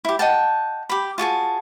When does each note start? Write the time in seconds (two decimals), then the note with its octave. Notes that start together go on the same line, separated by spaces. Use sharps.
0.05 E4 G4
0.19 D#5 F#5 G5 A5
0.89 G4 B5
1.18 F4 F#4 G#4 A5